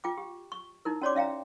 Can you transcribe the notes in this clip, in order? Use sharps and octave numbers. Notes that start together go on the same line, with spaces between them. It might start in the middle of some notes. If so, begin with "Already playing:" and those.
F4 G5 D6
G4
C#6
D#4 E4 A#4
C#4 F#4 C#5 D5 C6 D6
C#4 E5 F5 G5 A#5